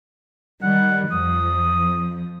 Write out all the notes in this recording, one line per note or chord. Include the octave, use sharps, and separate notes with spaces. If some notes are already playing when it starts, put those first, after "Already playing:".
D#3 G3 F#5
F2 F3 D#6